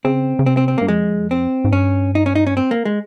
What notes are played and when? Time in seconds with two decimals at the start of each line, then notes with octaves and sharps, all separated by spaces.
0.04 C#3 C4
0.39 C#3
0.46 C3 C4
0.57 C4
0.68 C4
0.78 G2 A#3
0.88 F2 G#3
1.31 C4
1.64 G#2
1.73 G2 C#4
2.15 D#4
2.26 C#4
2.35 D#4
2.47 C#4
2.57 C4
2.71 A#3
2.85 G#3